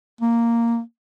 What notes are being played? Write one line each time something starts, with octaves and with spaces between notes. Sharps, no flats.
A#3